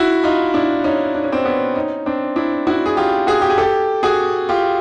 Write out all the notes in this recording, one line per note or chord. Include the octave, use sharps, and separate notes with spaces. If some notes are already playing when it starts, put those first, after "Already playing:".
Already playing: E4 F#4
D#4 F4
D4 E4
C#4 D#4
D4
C#4
C4 D4
B3 C#4
C#4 D#4
C4 D4
D4 E4
E4 F#4
G#4
F4 G4
F#4 G#4
G4
G#4
G4 A4
F#4 G#4
F4 G4